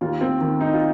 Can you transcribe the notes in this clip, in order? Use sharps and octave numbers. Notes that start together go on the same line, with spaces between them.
D#2 F4
C4
D#3
D#4
F4